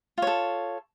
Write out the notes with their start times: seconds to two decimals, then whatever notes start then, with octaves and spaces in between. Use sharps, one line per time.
0.18 F4
0.22 C#5
0.27 A4